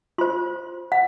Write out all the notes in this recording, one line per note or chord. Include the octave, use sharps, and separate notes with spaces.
F4 C5 C6
F#5